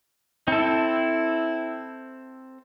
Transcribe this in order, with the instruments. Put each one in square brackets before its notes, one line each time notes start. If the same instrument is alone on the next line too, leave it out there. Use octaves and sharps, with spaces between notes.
[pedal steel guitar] C4 A4 [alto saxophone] E4